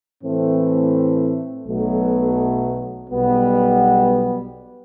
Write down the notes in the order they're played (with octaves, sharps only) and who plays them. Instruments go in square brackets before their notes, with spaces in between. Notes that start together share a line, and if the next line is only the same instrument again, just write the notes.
[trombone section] A2 E3 A3 C4
B1 B2 F#3 A3
B1 B2 G3 B3